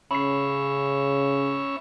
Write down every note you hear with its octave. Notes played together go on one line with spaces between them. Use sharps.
C#3 C#4 C#5 E5 B5 C7